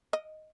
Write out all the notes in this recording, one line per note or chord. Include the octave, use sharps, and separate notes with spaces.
D#5